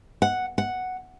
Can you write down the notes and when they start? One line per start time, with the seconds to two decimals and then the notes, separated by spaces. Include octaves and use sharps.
0.22 F#5
0.58 F#5